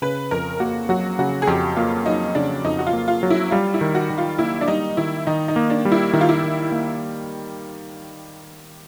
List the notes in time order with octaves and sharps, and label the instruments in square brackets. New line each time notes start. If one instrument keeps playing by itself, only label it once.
[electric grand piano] C#3 [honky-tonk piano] B4
[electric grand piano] F2 [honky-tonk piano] A#4
[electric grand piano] A#3 [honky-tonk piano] F#4
[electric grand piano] F#3 [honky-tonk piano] F#4
[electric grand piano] C#3 [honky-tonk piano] F#4
[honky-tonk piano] G#4
[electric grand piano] F2 [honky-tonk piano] G4
[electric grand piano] A#3 [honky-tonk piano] F4
[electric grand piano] F#3 [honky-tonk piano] D#4
[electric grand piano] C#3 [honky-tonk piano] D4
[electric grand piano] F2 [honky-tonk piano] D#4
[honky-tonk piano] F#4
F4
[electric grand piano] A#3
[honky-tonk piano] F4
[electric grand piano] F#3
[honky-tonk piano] E4
[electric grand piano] G3 [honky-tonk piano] F4
[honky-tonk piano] E4
[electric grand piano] D#3
[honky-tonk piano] F#4
[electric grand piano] D#3
[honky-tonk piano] F4
[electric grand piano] A#3 [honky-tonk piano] E4
[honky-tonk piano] D4
[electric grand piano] G3 [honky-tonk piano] D#4
[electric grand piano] D#3 [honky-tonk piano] E4
[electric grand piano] D#3 [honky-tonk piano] D#4
[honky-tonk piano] D#4
[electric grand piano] A#3
[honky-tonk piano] D4
[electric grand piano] G3
[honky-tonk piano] E4
[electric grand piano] D#3 [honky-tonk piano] E4
[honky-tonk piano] F4
E4
[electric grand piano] D#3
A#3